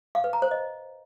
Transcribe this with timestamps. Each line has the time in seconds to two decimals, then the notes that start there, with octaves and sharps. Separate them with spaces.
0.15 F5
0.24 B4
0.33 A#5
0.42 C5
0.51 D#5